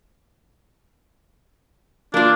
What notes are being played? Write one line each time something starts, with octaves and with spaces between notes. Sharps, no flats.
A#3 D4 F4